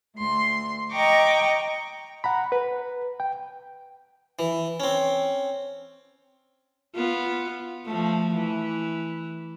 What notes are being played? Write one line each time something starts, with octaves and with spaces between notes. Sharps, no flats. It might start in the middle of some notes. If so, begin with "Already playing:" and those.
D2 C6
D#5 G5 A#5 C#6 D6
F#5 A#5 B5
B4
G5
E3
C4 C#4
B3 F4
F3 A3
E3